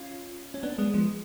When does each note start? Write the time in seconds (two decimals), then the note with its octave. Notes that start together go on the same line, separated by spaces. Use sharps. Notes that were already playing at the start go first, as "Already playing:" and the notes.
Already playing: C#4 F4
0.54 C#4
0.63 B3 D4
0.78 G#3 B3
0.94 F3 G#3